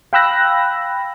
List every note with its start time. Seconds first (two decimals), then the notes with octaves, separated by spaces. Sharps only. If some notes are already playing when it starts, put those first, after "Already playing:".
0.13 F5 G5 B5 E6 F#6 A#6